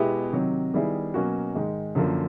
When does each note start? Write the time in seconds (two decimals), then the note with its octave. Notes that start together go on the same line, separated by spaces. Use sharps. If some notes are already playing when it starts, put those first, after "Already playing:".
Already playing: B2 G#3 B3 E4 G4
0.33 C3 D#3 F#3
0.74 D#3 G3 B3 E4 G#4
1.14 B2 F#3 A#3 C#4 F#4
1.55 G#2 D#3 G#3
1.95 F#2 D3 F3 A#3